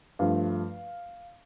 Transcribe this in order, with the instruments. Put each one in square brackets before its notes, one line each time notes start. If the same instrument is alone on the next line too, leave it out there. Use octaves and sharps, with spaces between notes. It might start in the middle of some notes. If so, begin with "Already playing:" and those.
[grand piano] G2 F3 A3 F5